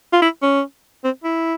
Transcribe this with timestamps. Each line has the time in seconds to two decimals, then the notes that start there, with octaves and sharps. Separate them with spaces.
0.13 F4
0.22 E4
0.42 C#4
1.04 C4
1.24 E4